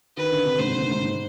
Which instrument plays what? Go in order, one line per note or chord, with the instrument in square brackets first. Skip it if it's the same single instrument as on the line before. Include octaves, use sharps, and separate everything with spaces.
[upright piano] D#3 [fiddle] B4
[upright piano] D3
C3
[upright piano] G#2 [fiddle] C5
[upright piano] G#2
G#2
G#2